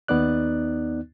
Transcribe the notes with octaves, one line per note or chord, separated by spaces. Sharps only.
D#2 B3 D#4 D5 F#6